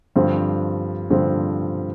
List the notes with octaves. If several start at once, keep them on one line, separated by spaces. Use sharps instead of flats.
G2 D3 F3 C4
G2 D3 F3 C4